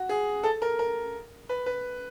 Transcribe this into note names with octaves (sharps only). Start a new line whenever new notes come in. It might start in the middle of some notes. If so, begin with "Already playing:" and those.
Already playing: F#4
G#4
A4
A#4
A#4
B4
B4